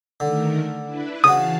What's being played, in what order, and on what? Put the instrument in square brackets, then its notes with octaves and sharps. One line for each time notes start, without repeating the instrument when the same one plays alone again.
[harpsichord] D3 [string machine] D#3 A3 A#4
[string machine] D4 E4 B4
[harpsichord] C#3 F#4 [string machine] E3 F5 A5 [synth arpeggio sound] D#6